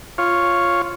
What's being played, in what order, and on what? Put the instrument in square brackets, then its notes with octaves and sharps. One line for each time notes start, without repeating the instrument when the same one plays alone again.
[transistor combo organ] F4 C#5